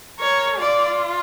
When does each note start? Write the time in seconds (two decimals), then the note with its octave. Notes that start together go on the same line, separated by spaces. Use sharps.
0.20 A#4 C#5
0.59 F4 D5